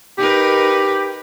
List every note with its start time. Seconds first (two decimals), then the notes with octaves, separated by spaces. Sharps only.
0.18 D#4 G4 A#4 B4